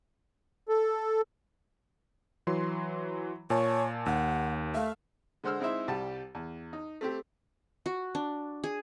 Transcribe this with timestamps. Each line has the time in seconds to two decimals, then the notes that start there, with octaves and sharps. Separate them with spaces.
0.69 A4
2.47 E3 F#3 C6
3.50 A#2 C#5 G#5 A5
4.06 D#2 F#5
4.74 A3 E5 F5
5.44 D3 G#3 C5 F#5 E6 F6
5.60 G#3 C4 D#4 E4 C5 E5
5.88 C2 G3 G4 A5
6.35 E2
6.73 D#4
7.01 A3 C4 G4
7.86 F#4
8.15 D4
8.64 G#4